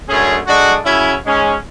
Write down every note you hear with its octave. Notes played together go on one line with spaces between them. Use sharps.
F#2 D3 A3 C#4 G#4
D3 G#3 D4 F#4
C#3 F#3 C#4 E4
G#2 G#3 C#4